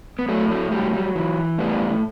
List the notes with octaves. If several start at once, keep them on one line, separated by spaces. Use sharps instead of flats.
B3
A2 F#3 A3
F#3 A3
F#3 G3
G3
E3
A2 G3 B3